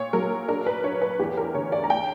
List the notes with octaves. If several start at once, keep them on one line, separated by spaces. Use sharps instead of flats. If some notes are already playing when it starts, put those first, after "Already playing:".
Already playing: A#2 C#5
F#3 A#4
D4 A#4
B4
D4 C#5
B4
E2 G4
A#4
D3 C#5
D5
A#5
G5